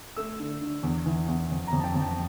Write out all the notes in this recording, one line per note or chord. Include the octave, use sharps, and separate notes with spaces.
A3 E6
D3
D3
E2
E3
E2
F2
A#5
F2
A5
G5
F2 A5
G5